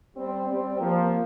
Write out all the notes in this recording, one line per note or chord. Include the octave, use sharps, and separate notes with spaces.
G3 C4
G3 C4
F3 A#3